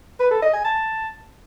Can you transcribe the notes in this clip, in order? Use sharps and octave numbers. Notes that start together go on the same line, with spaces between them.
B4
A4
D#5
G#5
A5